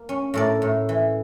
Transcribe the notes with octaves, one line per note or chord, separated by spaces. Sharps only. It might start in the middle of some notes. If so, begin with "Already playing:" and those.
Already playing: A#3
C#4
A2 A#4 D5
A2
E3